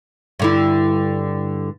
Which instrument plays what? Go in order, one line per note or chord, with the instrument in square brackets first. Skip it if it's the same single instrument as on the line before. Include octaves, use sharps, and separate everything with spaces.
[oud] G2 D3 E4